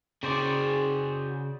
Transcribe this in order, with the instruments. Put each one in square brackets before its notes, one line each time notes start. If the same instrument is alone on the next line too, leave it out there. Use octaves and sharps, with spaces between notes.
[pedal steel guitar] C#3 C5 D5 [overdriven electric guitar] F#4 G#4